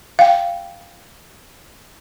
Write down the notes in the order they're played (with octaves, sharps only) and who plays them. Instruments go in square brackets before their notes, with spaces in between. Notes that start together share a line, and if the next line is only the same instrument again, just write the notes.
[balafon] F5 G5